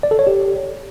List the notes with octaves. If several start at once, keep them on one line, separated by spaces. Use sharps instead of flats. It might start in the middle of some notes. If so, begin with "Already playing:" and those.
D5
A4
C#5
G4